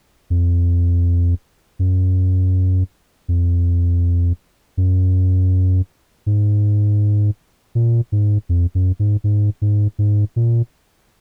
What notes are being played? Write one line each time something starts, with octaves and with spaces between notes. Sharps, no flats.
F2
F#2
F2
F#2
G#2
A#2
G#2
F2
F#2
G#2
G#2
G#2
G#2
A#2